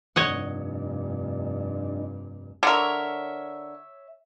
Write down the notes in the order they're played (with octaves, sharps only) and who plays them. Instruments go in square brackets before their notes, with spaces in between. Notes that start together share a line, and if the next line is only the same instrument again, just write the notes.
[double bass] F1 G2 [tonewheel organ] D4 D#4 [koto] C#5 D#5 F#5
[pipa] D3 A#4 [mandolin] C#5 E5